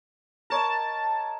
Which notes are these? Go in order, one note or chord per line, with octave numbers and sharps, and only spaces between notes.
A#4 C#5 D#5 A5